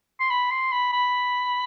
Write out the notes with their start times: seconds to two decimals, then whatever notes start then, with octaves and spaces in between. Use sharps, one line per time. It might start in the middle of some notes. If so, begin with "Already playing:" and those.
0.20 C6
0.30 B5
0.51 C6
0.72 B5
0.93 B5